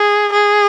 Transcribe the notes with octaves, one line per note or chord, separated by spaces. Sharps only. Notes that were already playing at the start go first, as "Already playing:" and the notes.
Already playing: G#4
G#4